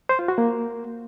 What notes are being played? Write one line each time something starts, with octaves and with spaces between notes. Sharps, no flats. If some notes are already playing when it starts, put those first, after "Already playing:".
C5
F4
F#4
A#3